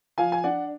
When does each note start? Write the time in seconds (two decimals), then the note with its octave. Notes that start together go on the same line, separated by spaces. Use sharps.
0.18 F3 F5 G#5
0.32 G#5
0.44 D4 D5 F#5